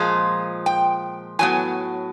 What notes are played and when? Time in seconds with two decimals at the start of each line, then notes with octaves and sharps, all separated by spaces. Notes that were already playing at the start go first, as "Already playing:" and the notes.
Already playing: A#2 F3 G#3
0.66 G5
1.39 A2 F#3 B3 G#5